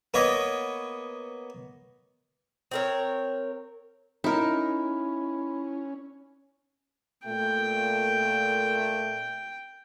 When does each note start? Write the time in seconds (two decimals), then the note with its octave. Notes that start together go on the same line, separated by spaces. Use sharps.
0.14 A#3 B3 C#5 D#5
2.71 C4 A#4 C#5
4.24 C#4 D#4 E4 A#4 E5 B5
7.26 A#2 A3 G5